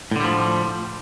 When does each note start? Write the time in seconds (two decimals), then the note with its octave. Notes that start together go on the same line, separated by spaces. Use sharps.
0.11 A2
0.16 D3
0.20 G3
0.24 F3